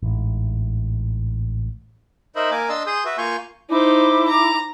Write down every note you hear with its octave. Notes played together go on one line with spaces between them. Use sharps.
A1 G#2
D#4 A#4 C5 D#5 E5 B5
A#3 A#4 G#5 D6
D4 D#5 A5 C6 E6
G#4 C6 D#6 G6
F#4 B4 E5
A#3 F4 F5 G#5 C#6 G6
D#4 E4 C5 D6
A#5